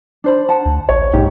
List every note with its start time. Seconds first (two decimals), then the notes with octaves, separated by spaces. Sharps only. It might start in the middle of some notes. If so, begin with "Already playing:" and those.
0.24 D4 C5 B5
0.49 F#5 A5
0.65 D2
0.89 A1 C#5
1.13 A#1 G#2 G4